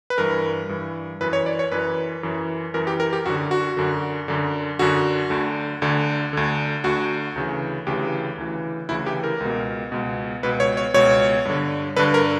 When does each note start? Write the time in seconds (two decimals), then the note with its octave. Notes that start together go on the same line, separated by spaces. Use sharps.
0.10 B4
0.18 G2 E3 A#4
0.69 G2 E3
1.21 F#2 E3 B4
1.33 C#5
1.46 D5
1.59 C#5
1.72 F#2 E3 B4
2.23 F#2 E3
2.74 F#2 E3 A#4
2.87 G4
3.00 A#4
3.13 G4
3.26 F#2 D3 F#4
3.51 F#4
3.77 F#2 D3
4.28 F#2 D3
4.79 F#2 D3 F#4
5.30 D2 D3
5.82 D2 D3
6.33 D2 D3
6.84 D2 D3 F#4
7.36 D2 C#3 E3
7.87 D2 C#3 E3 G4
8.38 D2 C#3 E3
8.89 D2 C#3 E3 E4
9.06 G4
9.23 A#4
9.40 C#2 B2
9.92 C#2 B2
10.43 C#2 B2 B4
10.60 C#5
10.77 C#5
10.94 C#2 B2 C#5
11.45 G2 D3
11.96 G2 D3 B4
12.14 A#4